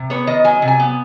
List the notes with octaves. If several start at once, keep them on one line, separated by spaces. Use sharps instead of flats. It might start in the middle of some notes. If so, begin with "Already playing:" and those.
Already playing: C3
B3 C#5
D#3 D#5
F#3 G#5
C3
G#5
B3